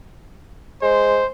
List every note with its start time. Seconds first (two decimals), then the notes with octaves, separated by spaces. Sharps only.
0.82 G#3 C5